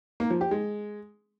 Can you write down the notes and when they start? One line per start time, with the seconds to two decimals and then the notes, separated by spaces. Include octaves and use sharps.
0.20 A#3
0.30 F3
0.41 G4
0.51 G#3